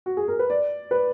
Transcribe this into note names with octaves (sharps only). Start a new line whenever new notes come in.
F#4
G#4
A#4
B4
D5
B4